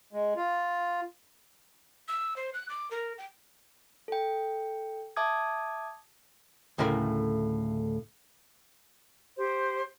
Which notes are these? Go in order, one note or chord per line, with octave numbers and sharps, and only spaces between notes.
G#3
F4
E6
C5
F#6
D6
A#4
G5
A4 G5
E5 A5 D6 D#6 G#6
D2 A2 C#3 A#4 B5
G4 C5